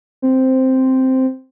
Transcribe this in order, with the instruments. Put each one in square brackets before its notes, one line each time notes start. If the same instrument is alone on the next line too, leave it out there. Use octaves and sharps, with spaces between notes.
[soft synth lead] C4